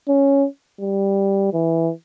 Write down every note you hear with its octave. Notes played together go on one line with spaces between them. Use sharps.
C#4
G3
E3